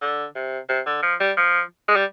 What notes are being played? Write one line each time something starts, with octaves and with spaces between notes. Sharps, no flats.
D3
C3
C3
D3
F3
G3
F3
G#3
G3